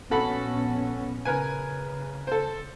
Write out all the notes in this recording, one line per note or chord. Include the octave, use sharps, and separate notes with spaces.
A#1 B3 C#4 F#4 A4 B5
C#3 A#4 B4 G#5
A4 C5